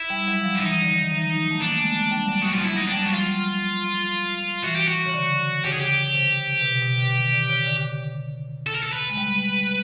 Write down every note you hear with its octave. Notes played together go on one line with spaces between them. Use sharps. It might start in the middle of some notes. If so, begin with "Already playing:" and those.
Already playing: E4
G3
F#3
F3
D4
E3 D#4
D3
D#3
E3
F#3
A3
A#3 D4
G#3
G#3
G3
F#3
F#3 F#4
F4
E4
D#4
G3 D4
F#3 F#4
F3 F4
E3 F#4
G4
F#4
C#3
D3
C#3 G4
G#4
G4
C3
B2
C3
B2
D3
D#3
D3
C#3
D3
A4
A#4
A4
B4
G#3
G3